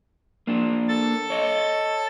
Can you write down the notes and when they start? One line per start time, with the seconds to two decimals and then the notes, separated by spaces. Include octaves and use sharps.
0.47 A#3 D4
0.88 A4 A6
1.30 C#5 D#5